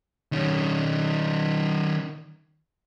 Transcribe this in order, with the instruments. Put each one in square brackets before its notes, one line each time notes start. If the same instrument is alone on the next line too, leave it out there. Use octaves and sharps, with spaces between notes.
[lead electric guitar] D#3 C#4